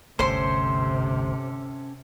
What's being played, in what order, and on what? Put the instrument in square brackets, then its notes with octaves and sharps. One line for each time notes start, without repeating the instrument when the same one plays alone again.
[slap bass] G1 D2 [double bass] C3 [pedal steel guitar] C#4 G4 A4 [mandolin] C5 C6